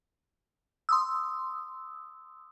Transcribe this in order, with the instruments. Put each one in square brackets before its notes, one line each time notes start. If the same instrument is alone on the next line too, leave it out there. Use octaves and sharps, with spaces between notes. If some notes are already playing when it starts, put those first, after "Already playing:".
[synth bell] C6 D#6 E6